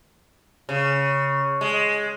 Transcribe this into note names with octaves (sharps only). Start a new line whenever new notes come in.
C#3
G#3